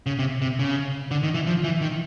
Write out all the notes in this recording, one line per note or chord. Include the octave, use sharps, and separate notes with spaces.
C#3
C3
C3
C#3
D3
D#3
E3
F3
E3
D#3